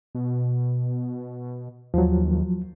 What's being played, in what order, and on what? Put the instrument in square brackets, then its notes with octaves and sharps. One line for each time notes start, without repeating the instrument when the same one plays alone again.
[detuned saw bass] B2
[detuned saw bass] D#2 [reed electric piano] F3 F#3